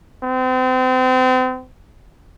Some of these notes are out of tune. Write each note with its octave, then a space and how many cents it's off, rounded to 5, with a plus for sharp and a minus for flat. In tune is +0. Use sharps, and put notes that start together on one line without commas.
C4 -35